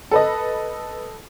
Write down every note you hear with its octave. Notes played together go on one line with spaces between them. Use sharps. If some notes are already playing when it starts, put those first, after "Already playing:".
A4 B4 D#5